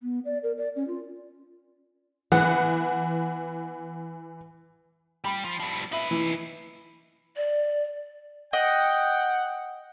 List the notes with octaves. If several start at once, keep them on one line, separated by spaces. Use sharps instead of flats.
B3
D5
A#4
D5
C#4
F4
E3 B3 F#5
G3 B5
F3
F3 G3
D#4 B4 E5 F#7
E3
D5
D#5 F#5 G5